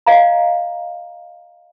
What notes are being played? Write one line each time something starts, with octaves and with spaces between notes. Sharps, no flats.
D#5 F5 A#5